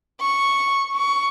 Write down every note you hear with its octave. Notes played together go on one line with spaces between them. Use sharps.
C#6
C#6